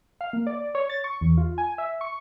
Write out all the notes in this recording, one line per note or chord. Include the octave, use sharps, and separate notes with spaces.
F5
A#3
D5
C#5
A6
C#6
E2
F4
G#5
E5
C#6